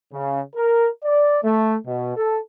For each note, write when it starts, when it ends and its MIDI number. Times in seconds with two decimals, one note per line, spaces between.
0.12 0.40 49
0.55 0.89 70
1.03 1.38 74
1.43 1.76 57
1.86 2.15 47
2.16 2.38 69